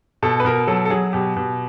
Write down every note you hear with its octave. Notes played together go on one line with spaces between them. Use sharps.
B2 A4
B4
B2 A#4
F#3 A4
A4
F#3 G#4
B2 G4
B2